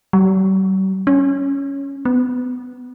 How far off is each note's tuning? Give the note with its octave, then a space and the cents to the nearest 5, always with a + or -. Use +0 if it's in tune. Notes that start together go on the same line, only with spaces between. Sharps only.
G3 -45
C#4 +5
B3 +25